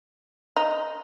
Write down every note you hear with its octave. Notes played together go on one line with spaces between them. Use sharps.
D#4